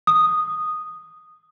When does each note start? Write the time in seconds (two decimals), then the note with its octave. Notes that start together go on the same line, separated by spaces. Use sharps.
0.07 D#6